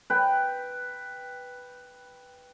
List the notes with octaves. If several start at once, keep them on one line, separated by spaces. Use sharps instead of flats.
B4 G5